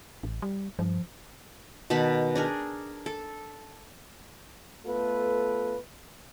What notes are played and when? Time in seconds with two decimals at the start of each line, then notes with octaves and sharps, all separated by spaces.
0.23 A1
0.42 G3
0.79 G2 F3
1.90 B2 D#3 A5 B5
2.35 D4 G#4 A#4
3.06 A4
4.85 A3 B3 F4 A4 B4